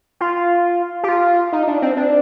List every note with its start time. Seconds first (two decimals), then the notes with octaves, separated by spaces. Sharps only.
0.20 F4
1.03 G4
1.09 F4
1.53 D#4
1.67 D4
1.82 C4
1.97 D4